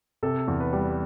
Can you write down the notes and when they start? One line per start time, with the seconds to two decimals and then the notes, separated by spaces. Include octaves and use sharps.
0.23 C3 A4
0.48 E2
0.60 B4
0.73 G3